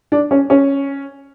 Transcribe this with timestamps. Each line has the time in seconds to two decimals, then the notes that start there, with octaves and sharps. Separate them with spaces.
0.12 D4
0.31 C#4
0.50 C#4